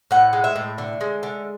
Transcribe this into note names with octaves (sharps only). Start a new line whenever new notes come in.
A2 F#5
G#3
E5
A2
D3
G#3
D3